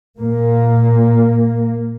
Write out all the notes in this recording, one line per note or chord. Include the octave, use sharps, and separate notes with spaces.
A#2 A#3